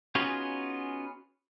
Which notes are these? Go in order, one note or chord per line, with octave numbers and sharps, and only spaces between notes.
B3 C#4 D#4 F4 F#4 G#4